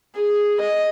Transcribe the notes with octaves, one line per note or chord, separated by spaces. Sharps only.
G#4
D#5